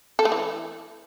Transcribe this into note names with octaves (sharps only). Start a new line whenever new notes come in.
A4
A3
E3